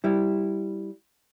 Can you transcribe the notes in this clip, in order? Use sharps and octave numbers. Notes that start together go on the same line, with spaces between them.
G3 E4